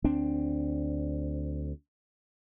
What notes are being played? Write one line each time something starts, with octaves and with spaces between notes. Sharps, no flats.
D2 C4 D4